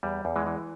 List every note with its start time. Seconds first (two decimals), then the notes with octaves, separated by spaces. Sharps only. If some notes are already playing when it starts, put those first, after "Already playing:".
0.03 E2 G3
0.25 E2
0.36 E3 G#3
0.46 E3